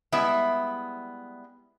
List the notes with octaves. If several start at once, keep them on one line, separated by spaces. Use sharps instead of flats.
G3 G#3 B3 E4 E5